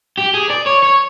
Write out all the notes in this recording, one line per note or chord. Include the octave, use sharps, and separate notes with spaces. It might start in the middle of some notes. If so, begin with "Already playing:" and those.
G4
G#4
D5
C#5
C#5